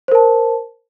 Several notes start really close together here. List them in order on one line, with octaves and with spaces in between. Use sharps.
C5 A#4 A5